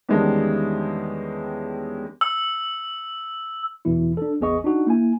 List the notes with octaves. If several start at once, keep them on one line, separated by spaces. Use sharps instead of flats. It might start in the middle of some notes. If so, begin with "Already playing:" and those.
E2 D#3 G3 G#3 C#4 D4
E6
E2 B2 E3 E4
D4 A4
A1 E2 B3 G#4 D#5 C#6
D4 D#4 F#4
A#3 E4 G#5